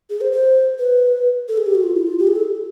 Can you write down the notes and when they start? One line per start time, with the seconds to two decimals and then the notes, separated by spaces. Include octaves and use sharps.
0.10 G#4
0.21 C5
0.32 C5
0.79 B4
1.48 A4
1.57 G#4
1.66 G4
1.75 F#4
1.83 F4
1.95 E4
2.07 F4
2.18 G4
2.27 G#4
2.36 A4